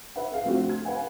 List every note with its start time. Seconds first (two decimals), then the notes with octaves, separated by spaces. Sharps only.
0.16 B4 E5 F#5
0.33 G#4 F5
0.45 C3 F3 A3 C4 D4 F#4
0.69 G#6
0.85 B4 F5 F#5 G#5